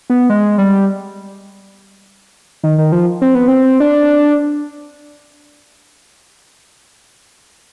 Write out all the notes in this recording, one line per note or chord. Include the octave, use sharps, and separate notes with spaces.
B3
G#3
G3
D#3
D#3
F3
C4
B3
C4
D4